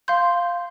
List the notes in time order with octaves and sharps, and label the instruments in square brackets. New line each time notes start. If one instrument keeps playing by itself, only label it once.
[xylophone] F5 C6 G6